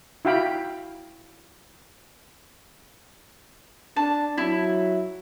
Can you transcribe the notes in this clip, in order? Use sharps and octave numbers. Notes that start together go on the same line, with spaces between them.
E4 F#4 F5 G5 B5
D4 A5
F#3 E4